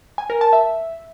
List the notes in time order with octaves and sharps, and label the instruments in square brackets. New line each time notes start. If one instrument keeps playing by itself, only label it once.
[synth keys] G#5
A#4
A5
E5